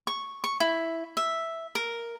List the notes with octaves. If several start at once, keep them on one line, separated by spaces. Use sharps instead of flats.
C#6
C#6
E4
E5
A#4